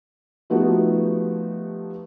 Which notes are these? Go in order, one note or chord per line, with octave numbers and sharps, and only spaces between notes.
F3 A3 B3 D#4 F#4 G4